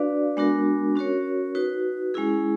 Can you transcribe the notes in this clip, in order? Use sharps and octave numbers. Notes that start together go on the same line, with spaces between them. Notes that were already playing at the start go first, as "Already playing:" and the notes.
Already playing: D4 F#4 B4 D5 F5
G#3 B3 D4 F#4 A#4
C#4 F#4 A#4 C#5
D#4 F#4 B4
G#3 C#4 E4 G#4